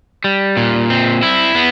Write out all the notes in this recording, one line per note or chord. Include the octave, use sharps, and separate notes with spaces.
G3
A#2
C4
E4
B3